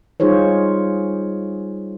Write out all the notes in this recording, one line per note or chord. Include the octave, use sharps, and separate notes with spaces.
G3 D#4 F4 G#4 C5 C#5